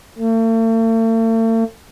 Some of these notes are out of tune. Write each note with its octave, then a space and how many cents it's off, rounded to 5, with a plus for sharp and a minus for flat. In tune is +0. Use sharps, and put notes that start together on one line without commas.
A3 +45